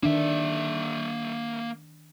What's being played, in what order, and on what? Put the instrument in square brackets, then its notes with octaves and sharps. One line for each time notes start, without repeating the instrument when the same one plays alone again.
[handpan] D#3 D4 [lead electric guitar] A#3 E5